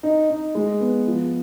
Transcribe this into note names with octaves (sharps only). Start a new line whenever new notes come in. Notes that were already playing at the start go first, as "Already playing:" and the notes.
D#4
D#4
G#3
B3
F3